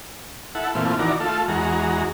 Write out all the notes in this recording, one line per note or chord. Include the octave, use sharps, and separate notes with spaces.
E4 A4 F#5
A#2 E3 A3 C4 F4
D#3 E3 F#4 D5 A#5
A3 F4 A4
E2 G#3 F#4 A#5